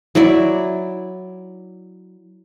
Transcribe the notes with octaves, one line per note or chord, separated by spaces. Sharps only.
F#3 E4 D5